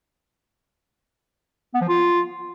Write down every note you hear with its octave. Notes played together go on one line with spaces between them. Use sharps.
B3
F3
F4